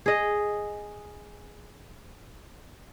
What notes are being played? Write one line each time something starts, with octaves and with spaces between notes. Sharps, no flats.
G#4 D#5